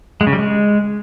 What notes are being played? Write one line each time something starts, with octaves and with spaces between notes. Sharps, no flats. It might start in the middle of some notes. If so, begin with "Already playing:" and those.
G#3
C#3
G3
G#3